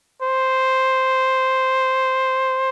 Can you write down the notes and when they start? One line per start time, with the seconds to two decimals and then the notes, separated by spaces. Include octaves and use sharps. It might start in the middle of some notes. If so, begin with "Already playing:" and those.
0.22 C5